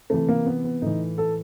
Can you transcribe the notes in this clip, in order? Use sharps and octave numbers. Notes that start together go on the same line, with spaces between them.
C3 E3 A3
A#3
B3
B3
A2 E3 D#4
A4